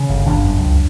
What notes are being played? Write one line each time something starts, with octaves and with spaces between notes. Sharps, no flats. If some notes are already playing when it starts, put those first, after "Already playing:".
Already playing: C#3 C#4
G1
G1 D4
F#2
C#2